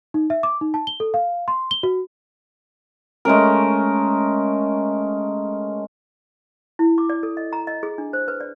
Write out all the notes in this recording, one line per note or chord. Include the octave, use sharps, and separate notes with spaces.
D#4
E5
D6
D#4
A5
G7
A4
F5
C6
G7
F#4
G#3 A3 C#4 A#4
E4
D6
D5
A4
D#5
A#5
D#5
G#4
D4
C5
B4
D5